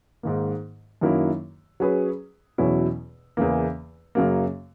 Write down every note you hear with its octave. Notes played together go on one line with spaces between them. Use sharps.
G#2 D#3 A#3
F#2 D#3 F#3 A#3 E4
F#3 C#4 G#4 B4
E2 B2 F#3 C#4 E4
E2 C#3 E3 A#3
F#2 C#3 F#3 A#3